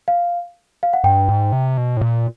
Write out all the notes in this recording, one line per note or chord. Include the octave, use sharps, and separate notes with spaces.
F5
F5
F#5
G2 G5
G#2
C3
B2
A2
A#2